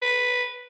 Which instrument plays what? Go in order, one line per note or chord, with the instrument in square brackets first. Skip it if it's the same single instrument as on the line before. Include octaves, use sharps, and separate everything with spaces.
[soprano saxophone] B4